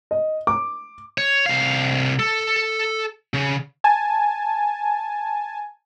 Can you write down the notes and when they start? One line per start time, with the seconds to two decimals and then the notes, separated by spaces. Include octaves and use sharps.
0.11 D#5
0.47 D6
1.18 C#5
1.46 C2 F5
2.19 A4
3.34 C#3
3.84 G#5 A5